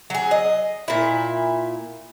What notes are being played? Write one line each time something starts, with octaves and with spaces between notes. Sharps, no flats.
F#3 G#4
D#5
A#2 E4